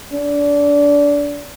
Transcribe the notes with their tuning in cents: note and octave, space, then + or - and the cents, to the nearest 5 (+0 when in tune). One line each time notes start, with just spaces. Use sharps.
D4 -25